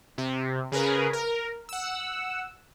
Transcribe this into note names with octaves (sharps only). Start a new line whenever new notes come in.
C3
C#3 G#4 A#4 B4
A#4
F#5 E6